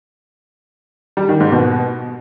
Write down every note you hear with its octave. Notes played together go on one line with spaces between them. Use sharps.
G3
D#3
G#2
B2